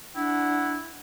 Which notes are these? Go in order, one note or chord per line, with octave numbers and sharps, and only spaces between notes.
D4 E4 F#5